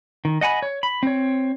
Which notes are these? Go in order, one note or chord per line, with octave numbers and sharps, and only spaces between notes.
D#3
D#5 F#5 G#5 B5
C#5
B5
C4 C#5